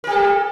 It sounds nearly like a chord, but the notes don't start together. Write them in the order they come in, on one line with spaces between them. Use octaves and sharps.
A#4 G4 A4